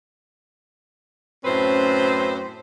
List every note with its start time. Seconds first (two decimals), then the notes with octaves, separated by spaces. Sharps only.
1.44 F#2 A2 C4 C#4 B4 C5